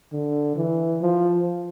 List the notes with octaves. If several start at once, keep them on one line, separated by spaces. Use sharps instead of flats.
D3
E3
F3